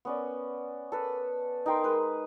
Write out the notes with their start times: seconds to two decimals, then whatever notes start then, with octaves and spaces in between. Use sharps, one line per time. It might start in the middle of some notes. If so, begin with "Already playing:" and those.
0.05 B3 C#4 D5
0.92 A4 B4
1.66 D#4 A#4 G5 C6
1.84 G#3 B4